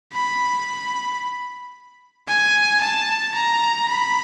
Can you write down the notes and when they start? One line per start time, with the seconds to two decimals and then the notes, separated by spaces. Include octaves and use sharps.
0.13 B5
2.28 G#5
2.81 A5
3.34 A#5
3.88 B5